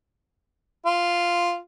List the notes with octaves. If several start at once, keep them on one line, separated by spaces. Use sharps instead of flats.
F4